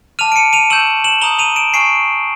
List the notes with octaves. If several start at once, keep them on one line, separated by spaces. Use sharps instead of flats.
A5 D6 F6 D#7 F7
D7
C#7 D#7
D#7 F7
C#6 E6 G6 E7 F#7
E7 F#7
A#5 D#6 G6 F7 G7
D#7 F7
D7 E7
G#5 C#6 F6 C7 D7